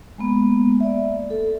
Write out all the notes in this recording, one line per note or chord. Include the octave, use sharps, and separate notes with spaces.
G#3 A#3 B3
D5 E5
A4